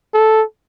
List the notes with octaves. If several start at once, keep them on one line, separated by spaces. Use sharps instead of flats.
A4